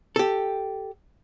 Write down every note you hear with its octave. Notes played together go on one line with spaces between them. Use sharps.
G4 A4